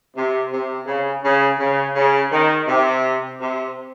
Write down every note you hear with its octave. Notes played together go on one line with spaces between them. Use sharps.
C3
C3
C#3
C#3
C#3
C#3
D#3
C3
C3